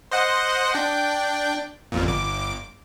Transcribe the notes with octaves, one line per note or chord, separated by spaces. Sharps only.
C5 D#5 F#5
D4 G5
A1 F2 A#2
G1 D6